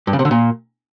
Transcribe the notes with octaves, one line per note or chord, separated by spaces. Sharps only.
G2
C#3
C3
D3
A#2